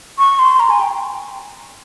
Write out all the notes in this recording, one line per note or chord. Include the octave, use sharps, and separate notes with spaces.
C#6
C6
A#5
G#5
G5